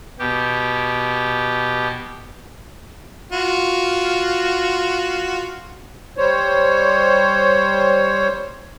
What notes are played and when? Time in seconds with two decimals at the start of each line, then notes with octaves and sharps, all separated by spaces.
0.19 B2 G4
3.32 F4 F#4
6.17 G3 C5 C#5